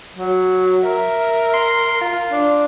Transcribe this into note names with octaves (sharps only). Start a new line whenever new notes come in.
F#3
A#4 E5
C6
F4
D4